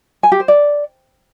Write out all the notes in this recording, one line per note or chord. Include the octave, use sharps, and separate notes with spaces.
G#5
G4
C5
D5